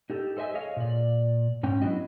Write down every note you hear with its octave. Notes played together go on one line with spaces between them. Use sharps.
D#4 G4 A4
A4 C5 D#5 E5 G#5
G#4 C#5 D#5 F5
A#2 D5
G#2 C#4 G5
F#3 B3 D4 E4 F#4 D#5